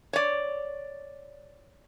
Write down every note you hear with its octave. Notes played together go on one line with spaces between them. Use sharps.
C#5 D5